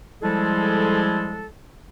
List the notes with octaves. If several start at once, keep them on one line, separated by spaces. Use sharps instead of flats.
F3 G3 G#3 E4 G#4 A4